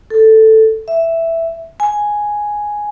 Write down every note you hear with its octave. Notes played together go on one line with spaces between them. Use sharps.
A4
E5
G#5